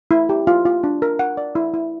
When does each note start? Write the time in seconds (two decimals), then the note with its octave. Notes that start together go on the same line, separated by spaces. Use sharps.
0.11 E4
0.29 G4
0.47 F4
0.65 F4
0.84 D4
1.02 A#4
1.19 F#5
1.37 D5
1.55 E4
1.74 E4